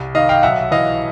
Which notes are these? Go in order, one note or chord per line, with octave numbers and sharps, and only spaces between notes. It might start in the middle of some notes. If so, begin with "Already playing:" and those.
Already playing: C2
D#3 D#5 F5
F5 G5
B1 E5 F#5
E3 D#5 F5